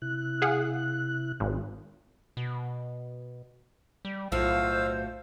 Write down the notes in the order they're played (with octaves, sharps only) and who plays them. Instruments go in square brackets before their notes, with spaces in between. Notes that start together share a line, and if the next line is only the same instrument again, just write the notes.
[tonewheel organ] C3 E4 F#6
[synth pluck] G#4 F5 F#5
G#1
[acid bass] B2
G3
[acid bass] B1 [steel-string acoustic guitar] A2 F4 F#4 [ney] C5 [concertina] F5 E6